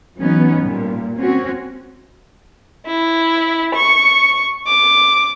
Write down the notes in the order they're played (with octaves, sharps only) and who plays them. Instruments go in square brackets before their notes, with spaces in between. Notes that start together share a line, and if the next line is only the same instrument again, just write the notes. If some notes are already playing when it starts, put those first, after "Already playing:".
[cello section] E3 F#3 B3 C#4 D#4
A#2 G3
C4 C#4 F#4
[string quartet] E4
C#6
D6